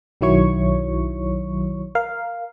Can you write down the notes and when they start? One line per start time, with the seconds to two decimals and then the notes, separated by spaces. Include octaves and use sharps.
0.21 B1 D#3 F#3 E4 C#5 C#6
1.95 A#4 F5